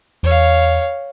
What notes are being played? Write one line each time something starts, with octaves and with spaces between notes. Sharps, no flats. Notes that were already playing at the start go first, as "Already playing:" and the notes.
E2 C#5 F5